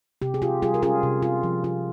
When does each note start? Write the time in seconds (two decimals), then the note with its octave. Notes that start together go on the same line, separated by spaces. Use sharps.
0.22 C3 G4
0.34 G#4
0.42 F4 G4
0.62 G3 F4 G#4
0.74 A#4
0.82 C#4 F4 G#4
1.03 C3
1.23 F4
1.43 F3
1.64 F4